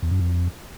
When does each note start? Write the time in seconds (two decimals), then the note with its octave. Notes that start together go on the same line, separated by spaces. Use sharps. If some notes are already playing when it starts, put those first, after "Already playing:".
0.02 E2
0.11 F#2
0.19 F2